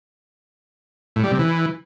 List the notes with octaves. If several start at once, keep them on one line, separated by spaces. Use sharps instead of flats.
A2
G3
C3
E3